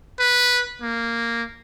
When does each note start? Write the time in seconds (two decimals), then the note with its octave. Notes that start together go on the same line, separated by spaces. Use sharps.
0.19 B4
0.82 A#3